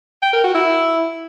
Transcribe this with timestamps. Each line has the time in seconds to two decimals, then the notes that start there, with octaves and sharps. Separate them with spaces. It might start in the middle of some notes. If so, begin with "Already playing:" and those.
0.22 G5
0.33 A#4
0.44 F#4
0.55 E4